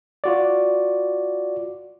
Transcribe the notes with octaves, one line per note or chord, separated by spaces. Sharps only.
F4 F#4 D5